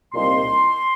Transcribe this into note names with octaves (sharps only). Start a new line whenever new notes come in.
C2 A#2 G3 C4 D#4 C6